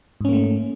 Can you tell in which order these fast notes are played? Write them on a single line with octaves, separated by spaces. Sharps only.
G#2 C#4 A#3 A3